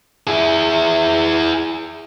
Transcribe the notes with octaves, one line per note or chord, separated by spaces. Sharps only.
E4 G#4